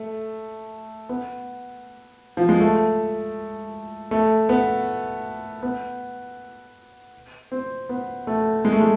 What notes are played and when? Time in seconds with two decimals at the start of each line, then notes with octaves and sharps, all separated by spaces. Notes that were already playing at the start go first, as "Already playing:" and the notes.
Already playing: A3
1.09 B3
2.37 F3
2.49 G#3
2.60 A3
4.11 A3
4.49 B3
5.63 B3
7.52 C4
7.89 B3
8.27 A3
8.65 G#3
8.72 A3
8.80 G#3